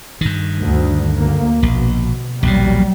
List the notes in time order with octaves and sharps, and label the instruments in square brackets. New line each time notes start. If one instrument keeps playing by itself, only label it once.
[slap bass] G2 D#3
[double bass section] D2
D2 A#3
[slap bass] A#1 [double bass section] B2
[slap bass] A#1 D#2 B2 [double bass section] F#3 G3